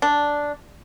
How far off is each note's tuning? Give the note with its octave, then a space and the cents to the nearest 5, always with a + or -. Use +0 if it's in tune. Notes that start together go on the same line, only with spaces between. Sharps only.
D4 -5